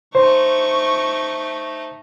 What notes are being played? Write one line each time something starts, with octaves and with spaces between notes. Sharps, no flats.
A3 D#4 C5 C#6